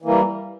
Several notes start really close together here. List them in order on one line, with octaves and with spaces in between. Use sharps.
E3 A#3 G3